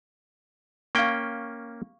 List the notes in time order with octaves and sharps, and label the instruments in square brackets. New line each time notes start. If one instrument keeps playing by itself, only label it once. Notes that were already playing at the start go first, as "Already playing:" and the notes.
[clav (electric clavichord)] A#3 C#4 G5 [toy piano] F5 C#6